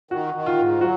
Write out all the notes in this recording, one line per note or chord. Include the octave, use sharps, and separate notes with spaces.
D#3 F#4
D#3
F4
G#2
F#3 F#4